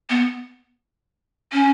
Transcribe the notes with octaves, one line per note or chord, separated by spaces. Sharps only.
B3
C#4